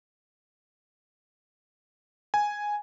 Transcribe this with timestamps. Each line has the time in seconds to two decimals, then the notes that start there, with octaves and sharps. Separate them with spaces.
2.34 G#5